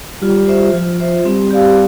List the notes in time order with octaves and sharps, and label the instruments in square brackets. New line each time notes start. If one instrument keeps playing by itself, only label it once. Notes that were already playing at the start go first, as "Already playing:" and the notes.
[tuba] G3 [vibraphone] F4
[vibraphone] C5 E5
[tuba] F3 [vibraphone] F4
[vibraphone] C5 E5
[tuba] G3 [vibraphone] C4
[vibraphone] G4 D5 F5